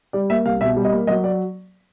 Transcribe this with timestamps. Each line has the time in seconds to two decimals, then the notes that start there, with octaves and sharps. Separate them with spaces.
0.13 G3 D5
0.30 A#3 E5
0.45 C2 F5
0.61 B2 E5
0.77 G3
0.85 D#5
0.92 A#3
1.07 F#3 D#5
1.24 D5